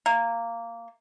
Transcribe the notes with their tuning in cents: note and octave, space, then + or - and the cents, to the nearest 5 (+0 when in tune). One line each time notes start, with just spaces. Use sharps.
A#3 -10